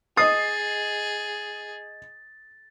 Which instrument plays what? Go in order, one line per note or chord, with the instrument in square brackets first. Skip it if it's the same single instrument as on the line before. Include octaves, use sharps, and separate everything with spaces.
[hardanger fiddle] G#4 [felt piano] D#5 C7 [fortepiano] D#6 [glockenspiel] A6